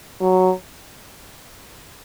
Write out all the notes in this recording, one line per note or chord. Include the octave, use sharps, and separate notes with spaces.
F#3